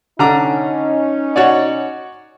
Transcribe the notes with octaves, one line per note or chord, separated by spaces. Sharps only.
D3 C#4 D#4 A#5 D6
F#4 C#5 D5